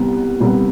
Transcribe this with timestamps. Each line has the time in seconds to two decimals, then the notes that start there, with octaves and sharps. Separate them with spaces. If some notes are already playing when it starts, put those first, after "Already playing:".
Already playing: C2 C3 G3 B3
0.40 C2 C3 G3 B3